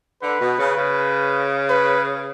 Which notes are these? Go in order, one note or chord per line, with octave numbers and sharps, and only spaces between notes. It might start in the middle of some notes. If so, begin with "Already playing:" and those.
D3 B4
B2
C#3
C#3
B4